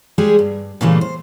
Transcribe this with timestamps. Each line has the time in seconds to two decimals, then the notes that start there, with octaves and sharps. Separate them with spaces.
0.18 G3 G#3 G4 G#4
0.39 G2
0.81 A#2 C#3 E3 G3 A3 A#3
1.01 C5